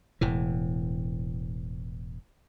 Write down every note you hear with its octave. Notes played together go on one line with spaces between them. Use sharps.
E1 A2 E3